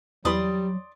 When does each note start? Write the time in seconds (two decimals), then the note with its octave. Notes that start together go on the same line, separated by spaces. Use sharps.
0.25 E2 E3 F#3 G3 D5 B5 C6 D#6